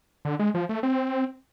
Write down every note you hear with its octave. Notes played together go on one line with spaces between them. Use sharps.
D3
G#3
F3
A3
C4